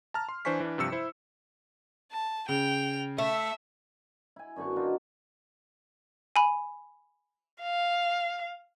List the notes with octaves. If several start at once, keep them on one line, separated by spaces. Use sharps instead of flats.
A5 A#5 F6
C6
E3 D4 C5 G#5 C#6 B6
E3 D4
G2 C3 F3 E6 C#7
E4 C5
A5
C#3 G5 F7
A3 E5 E6
E4 G#5
F#2 D3 B3 C#6
D4 D#4 F4 F#4
G#5 B5
F5